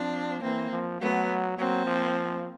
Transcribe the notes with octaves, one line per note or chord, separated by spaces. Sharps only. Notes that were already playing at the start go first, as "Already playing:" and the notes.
Already playing: F3 C4 D4
E3 A#3 C4
F3
F#3 A3 B3
F#3 A#3 C4
F3